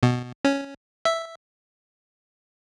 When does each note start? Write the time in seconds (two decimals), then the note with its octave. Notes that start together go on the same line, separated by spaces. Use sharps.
0.03 B2
0.45 C#4
1.05 E5